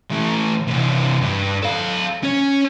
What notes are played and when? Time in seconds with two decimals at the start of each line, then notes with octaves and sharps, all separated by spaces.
0.11 A2 E3
0.67 C3 E3
1.21 G2
1.62 A4 F5
2.23 C#4 C#5